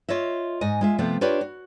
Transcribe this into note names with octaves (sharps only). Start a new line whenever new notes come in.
F4 C#5 D#5 E5
G#2 D#5 G#5
G#3 F4 E5
C3 F3 A3 B3
D4 F4 G4 B4 C#5
F#4